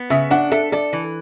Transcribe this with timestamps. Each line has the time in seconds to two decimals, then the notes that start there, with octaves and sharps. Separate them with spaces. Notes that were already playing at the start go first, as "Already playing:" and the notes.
Already playing: B3
0.10 C#3 E5
0.31 D4 F#5
0.52 A4 E5
0.72 A4 D5
0.93 E3